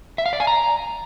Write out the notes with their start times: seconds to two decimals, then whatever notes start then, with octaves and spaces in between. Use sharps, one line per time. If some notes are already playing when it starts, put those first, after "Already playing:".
0.18 E5
0.26 F5
0.33 D5
0.40 G#5
0.47 A#5